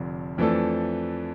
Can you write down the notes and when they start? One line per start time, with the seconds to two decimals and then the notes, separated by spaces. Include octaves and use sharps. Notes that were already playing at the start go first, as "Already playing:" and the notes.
Already playing: F1 F2 D3
0.38 F2 E3 A3 D4 A4